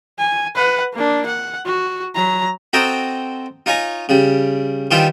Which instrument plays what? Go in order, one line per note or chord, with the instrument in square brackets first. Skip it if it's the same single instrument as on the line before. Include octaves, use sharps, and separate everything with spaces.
[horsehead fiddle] G#5
B4 F#5
A#3 D4
F#5
F#4
F#3 A#5
[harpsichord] C4 F#4 A4 D#5 G5 A#5
D#4 F4 C#5 G#5 A#5
C#3 G3
D#3 E3 G3 F4 G4 C5